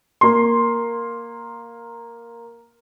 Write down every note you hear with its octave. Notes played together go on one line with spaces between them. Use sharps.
A#3 C6